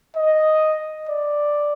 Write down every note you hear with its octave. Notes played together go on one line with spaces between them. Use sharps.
D#5
D5